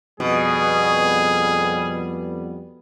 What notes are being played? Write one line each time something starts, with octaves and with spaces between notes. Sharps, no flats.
F2 B2 G3 B3 G#4